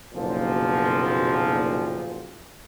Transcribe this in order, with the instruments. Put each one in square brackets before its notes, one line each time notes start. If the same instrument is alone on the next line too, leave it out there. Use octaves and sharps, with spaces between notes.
[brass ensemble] F#1 B1 A#2 F3